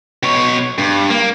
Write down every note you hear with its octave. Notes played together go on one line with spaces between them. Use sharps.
B2 C#5
G2
A#3